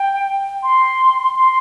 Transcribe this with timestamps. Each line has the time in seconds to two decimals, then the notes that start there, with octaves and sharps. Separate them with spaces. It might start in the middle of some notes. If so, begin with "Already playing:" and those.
Already playing: G5
0.63 C6
1.35 C6